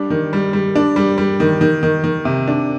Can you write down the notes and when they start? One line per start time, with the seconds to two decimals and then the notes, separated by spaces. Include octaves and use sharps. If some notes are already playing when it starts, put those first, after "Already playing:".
Already playing: G3 D4
0.10 D#3
0.33 G3
0.53 G3
0.75 D4
0.96 G3
1.18 G3
1.40 D#3
1.61 D#3
1.83 D#3
2.04 D#3
2.25 C3
2.48 D4